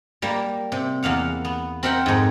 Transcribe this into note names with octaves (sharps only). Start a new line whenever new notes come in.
G3 A#3
C3
E2 A#3 F5 F#5
B3
C4 A#4 E5 F#5 G5
F2 G#2